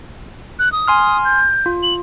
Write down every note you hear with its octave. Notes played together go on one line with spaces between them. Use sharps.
F#6
D#6
G#5 C6 F6
G6
F4
F#7